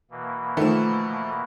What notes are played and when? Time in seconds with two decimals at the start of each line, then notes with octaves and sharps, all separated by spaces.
0.11 B2 E3 A#3
0.57 D#3 F3 A3 E7